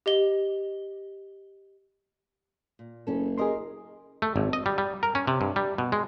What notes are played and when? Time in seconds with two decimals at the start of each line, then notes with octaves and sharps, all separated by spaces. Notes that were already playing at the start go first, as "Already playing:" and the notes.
0.06 G4 D#5 G7
2.79 A#2
3.07 F#1 B3 C#4 A4
3.38 E4 G4 G#4 A#4 D#5 C6
4.22 A3
4.36 G#1
4.53 D#5
4.66 G3
4.78 G3
5.03 A#4
5.15 C#4
5.27 C3
5.41 G2
5.56 G3
5.78 B2
5.92 G#3